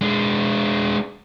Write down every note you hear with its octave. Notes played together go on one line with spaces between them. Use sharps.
G#3 D4